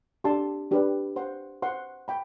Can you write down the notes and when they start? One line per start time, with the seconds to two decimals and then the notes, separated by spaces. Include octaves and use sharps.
0.24 D4 G4 D5 A5 C6
0.71 D4 G4 B4 D5
1.16 C5 F#5 C6
1.62 C5 F#5 C6
2.08 G5 B5